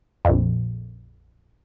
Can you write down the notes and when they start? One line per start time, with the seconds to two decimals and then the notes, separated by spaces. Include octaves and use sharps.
0.25 A#1 F2